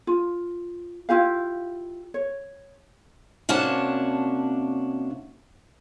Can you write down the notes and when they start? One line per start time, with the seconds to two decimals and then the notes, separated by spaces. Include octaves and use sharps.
0.07 F4
1.09 E4 F4 G4 F5
2.14 C#5
3.49 C3 A#3 C#4 D4 F#4 A5